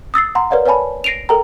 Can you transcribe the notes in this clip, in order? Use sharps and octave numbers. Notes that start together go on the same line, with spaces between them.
D#6 E6 A6 C7
F#5 A#5 C6
A#4 B4 C#5 D5 F5 F#5
B4 C#5 F5 G#5 A5 B5
A#6 C7 D7 D#7 F7
A4 A#4 G5 A#5